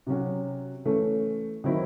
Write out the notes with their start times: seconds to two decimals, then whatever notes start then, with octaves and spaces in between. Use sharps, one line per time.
0.07 C3 F#3 C#4 F#4
0.85 E3 A3 C#4
1.64 D#3 F#3 C4 E4